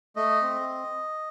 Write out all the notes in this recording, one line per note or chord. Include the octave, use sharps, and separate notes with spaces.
A3 D#5
C4